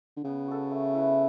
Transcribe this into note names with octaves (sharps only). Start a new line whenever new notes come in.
D3
C#3 B3
F#4 A4
A3
E4 B4